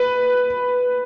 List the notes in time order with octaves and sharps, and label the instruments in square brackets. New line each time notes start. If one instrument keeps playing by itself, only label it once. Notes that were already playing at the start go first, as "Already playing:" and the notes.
Already playing: [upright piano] B4